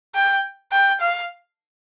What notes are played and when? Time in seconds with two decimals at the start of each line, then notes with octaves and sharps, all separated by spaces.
0.15 G5
0.72 G5
1.01 F5